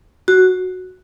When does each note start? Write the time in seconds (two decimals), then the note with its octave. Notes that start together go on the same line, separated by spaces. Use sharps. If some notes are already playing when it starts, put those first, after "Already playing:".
0.28 F#4